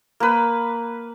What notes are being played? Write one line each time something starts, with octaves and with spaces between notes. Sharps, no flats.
A#3 B4